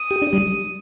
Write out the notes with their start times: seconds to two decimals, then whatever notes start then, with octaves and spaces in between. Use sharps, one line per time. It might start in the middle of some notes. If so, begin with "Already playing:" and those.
Already playing: D#6
0.11 G4
0.22 D4
0.33 G3